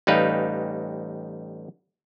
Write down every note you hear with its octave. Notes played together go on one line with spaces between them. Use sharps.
A1 G3 D#4 B4 F5